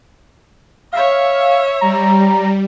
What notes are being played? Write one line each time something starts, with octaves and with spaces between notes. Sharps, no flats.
C#5 E5 F5
G3 A#5